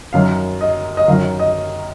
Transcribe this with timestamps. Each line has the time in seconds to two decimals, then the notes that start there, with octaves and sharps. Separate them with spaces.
0.13 F#2 D#3 F#3 F5
0.61 D#5
0.97 D#5
1.08 F#2 D#3 F#3 F5
1.40 D#5